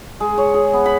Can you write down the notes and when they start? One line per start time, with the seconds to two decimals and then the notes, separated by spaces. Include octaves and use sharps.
0.20 G#3
0.38 C#5
0.54 G#4
0.73 B3
0.86 B5